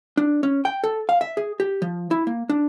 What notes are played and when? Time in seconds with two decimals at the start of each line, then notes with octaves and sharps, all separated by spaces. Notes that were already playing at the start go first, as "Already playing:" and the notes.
0.17 D4
0.43 C#4
0.65 G5
0.84 A4
1.09 F5
1.21 E5
1.37 G#4
1.60 G4
1.82 F3
2.11 E4
2.27 A#3
2.50 D4